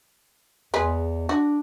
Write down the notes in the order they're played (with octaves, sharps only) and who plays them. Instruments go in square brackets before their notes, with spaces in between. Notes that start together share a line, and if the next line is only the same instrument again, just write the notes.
[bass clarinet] E2 [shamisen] G#3 G#4 B4
[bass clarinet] D4 [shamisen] F#4